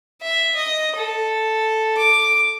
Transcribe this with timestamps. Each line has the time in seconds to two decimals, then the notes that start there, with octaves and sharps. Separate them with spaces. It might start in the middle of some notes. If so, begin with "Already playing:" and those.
0.22 E5
0.55 D#5
0.96 A4
1.97 D6